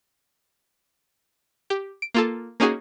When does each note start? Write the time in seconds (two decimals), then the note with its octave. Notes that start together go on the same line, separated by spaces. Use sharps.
1.70 G4
2.02 D7
2.14 A#3 F4 A4
2.60 A#3 C#4 D#4 F#4 G#4